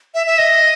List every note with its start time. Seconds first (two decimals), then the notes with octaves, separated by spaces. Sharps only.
0.14 E5
0.27 E5
0.38 D#5